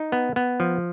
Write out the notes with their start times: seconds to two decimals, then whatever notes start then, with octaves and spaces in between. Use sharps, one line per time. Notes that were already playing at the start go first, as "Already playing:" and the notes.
Already playing: D#4
0.12 B3
0.36 B3
0.60 F3